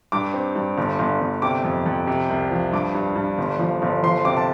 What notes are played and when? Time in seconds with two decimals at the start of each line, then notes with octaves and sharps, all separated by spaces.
0.12 G2 D6
0.34 C4
0.56 G2
0.78 G1
0.99 G1
1.20 G1
1.42 C3 D6
1.64 F2
1.86 F2
2.07 C3
2.30 C2
2.51 F3
2.72 G2 D6
2.95 G2
3.16 G2
3.38 G1
3.59 F3
3.82 G1
4.03 F3 C6
4.25 C3 D6
4.37 A5